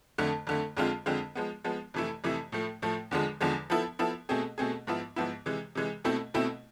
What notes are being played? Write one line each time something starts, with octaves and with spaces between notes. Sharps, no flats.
F2 D3 A3
F2 D3 A3
F2 D3 G#3 C4 F4
F2 D3 G#3 C4 F4
F3 G#3 B3
F3 G#3 B3
F2 C3 E3 A3 E4
F2 C3 E3 A3 E4
A2 F3 A3
A2 F3 A3
E2 D3 F3 G#3
E2 D3 F3 G#3
F3 B3 E4 A4
F3 B3 E4 A4
B2 A3 C4 G#4
B2 A3 C4 G#4
G#2 F3 B3 E4
G#2 F3 B3 E4
C3 E3 G#3
C3 E3 G#3
B2 A3 C4 E4
B2 A3 C4 E4